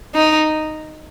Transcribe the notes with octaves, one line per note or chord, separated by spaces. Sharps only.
D#4